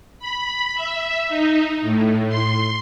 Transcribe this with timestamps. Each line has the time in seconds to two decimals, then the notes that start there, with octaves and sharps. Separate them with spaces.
0.19 B5
0.74 E5
1.29 D#4
1.81 A2
2.29 C6